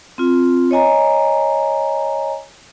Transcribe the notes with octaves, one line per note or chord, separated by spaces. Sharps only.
C4 F4
C#5 D#5 G#5 A#5